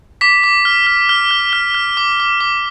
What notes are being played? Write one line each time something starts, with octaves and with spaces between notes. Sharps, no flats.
D6 B6
D6
F6
F6
F6
F6
F6
F6
D6
D6
D6